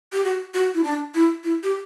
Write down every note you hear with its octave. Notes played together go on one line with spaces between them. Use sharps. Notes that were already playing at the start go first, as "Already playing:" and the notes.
G4
F#4
F#4
E4
D4
E4
E4
G4